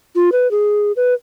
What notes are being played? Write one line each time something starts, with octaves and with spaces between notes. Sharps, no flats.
F4
B4
G#4
B4